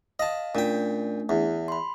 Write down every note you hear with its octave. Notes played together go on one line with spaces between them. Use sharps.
D#5 F5 A5
A#2 A3 C#4 D4 G5
E2
B5 C6